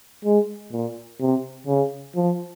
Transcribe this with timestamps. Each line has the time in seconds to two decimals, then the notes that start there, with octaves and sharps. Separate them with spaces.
0.25 G#3
0.72 A#2
1.20 C3
1.67 C#3
2.16 F3